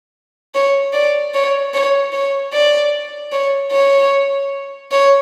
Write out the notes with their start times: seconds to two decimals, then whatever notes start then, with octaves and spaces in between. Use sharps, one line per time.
0.54 C#5
0.93 D5
1.34 C#5
1.74 C#5
2.12 C#5
2.53 D5
3.32 C#5
3.71 C#5
4.91 C#5